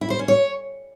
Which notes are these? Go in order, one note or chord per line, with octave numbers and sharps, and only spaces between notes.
E4
C5
C#4
C#5